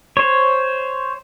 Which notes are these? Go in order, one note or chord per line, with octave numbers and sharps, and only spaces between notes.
C5 C#5